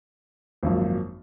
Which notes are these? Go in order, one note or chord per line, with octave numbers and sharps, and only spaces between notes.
G#1 F#2 F3 A#3